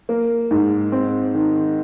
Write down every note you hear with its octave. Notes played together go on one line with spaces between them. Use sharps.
A#3
G#2
C4
D#3